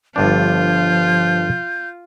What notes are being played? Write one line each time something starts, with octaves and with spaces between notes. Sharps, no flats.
G1 G2 F3 D4 F4 G6